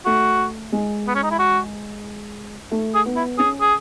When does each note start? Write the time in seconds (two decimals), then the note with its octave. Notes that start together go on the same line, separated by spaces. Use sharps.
0.06 A3 F#4
0.72 G#3
1.08 B3
1.15 C#4
1.23 D#4
1.31 E4
1.39 F#4
2.71 A3
2.95 G#4
3.06 B3
3.16 E4
3.38 C#4 G#4
3.61 G#4